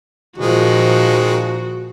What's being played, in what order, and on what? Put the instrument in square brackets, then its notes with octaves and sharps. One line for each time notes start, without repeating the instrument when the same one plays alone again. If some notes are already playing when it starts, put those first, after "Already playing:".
[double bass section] A#2 F3 [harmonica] D#3 G#3 [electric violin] F#4